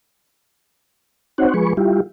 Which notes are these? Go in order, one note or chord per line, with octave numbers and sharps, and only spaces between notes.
C4 D#4 F#4 C5 C#5 F#5
F3 G#3 G#4 B4 C#6
G3 E4 F4 G4